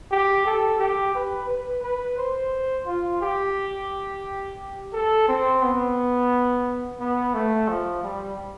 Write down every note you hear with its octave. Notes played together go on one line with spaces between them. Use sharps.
G4
A4
G4
B4
B4
B4
C5
F4
G4
A4
C4
B3
B3
A3
F3
G3